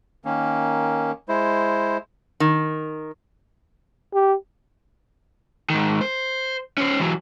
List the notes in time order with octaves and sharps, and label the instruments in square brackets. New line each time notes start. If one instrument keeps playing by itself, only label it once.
[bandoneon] D#3 A#3 C#4
G#3 E4 C5
[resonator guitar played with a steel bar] D#3
[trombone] G4
[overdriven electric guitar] G#2 D#3
C5
C#4 C5
E3 F#3